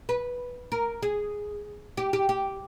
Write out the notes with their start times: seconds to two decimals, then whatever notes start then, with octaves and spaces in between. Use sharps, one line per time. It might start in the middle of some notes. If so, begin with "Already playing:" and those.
0.09 B4
0.72 A#4
1.03 G#4
1.97 G4
2.13 G4
2.29 G4